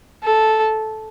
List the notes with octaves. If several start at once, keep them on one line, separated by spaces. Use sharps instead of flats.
A4